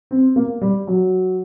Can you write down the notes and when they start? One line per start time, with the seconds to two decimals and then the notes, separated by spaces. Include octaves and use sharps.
0.11 C4
0.36 A#3
0.61 G3
0.87 F#3